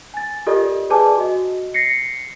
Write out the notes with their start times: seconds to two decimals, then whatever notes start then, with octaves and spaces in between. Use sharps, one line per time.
0.14 G#5 A6
0.46 F4 G4 A4 A#4 D5 D#5
0.90 G#4 B4 D5 G#5 A5 D6
1.17 F#4 D#5
1.74 A#6 C7 C#7